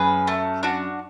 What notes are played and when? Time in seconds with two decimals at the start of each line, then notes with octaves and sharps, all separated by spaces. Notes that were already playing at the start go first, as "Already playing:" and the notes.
Already playing: F#2 G#4 B4
0.27 A3
0.63 D4 F#4